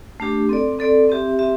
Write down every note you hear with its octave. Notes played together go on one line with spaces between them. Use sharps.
A3 D4 G4
C4 A4 D5
C4 A4 D5
C4 G4 E5
C4 G4 E5